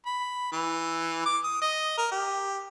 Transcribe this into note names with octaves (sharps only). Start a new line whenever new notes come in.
B5
E3
D6
D#6
D#5
A#4
G4